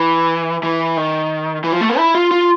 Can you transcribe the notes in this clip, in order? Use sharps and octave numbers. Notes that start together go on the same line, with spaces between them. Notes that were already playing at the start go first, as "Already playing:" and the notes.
Already playing: E3
E3
D#3
E3
F3
A3
A#3
E4
F4
F4